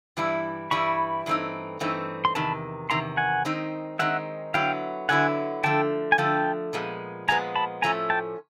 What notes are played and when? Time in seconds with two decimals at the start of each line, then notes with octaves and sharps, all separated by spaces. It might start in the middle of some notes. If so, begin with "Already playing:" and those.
0.17 G2 E3 G3 E4
0.71 G2 E3 G3 E4 B5 C#6
1.26 G2 E3 A3 C4 D#4
1.80 G2 E3 A3 C4 D#4
2.25 C6
2.35 E2 C3 D#3 A5 B5
2.90 E2 C3 D#3 A#5 C6
3.17 F#5 G#5
3.45 D#3 G#3 C4 D#4
3.99 D#3 G#3 C4 D#4 E5 F#5
4.54 D3 F#3 B3 E4 F5 G5
5.09 D3 F#3 B3 E4 F#5 G#5
5.63 D3 F3 A3 G5 A5
6.12 G#5
6.18 D3 F3 A3 G5 A5
6.73 A#2 F3 G#3 B3
7.28 A#2 F3 G#3 B3 G#5 A#5
7.55 A5 B5
7.82 A2 F3 A3 C#4 G#5 A#5
8.10 G5 A5